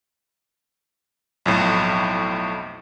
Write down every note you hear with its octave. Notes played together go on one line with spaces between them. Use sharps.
B1 F2 A2